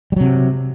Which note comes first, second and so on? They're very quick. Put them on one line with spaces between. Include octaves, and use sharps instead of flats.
G3 F#3 C3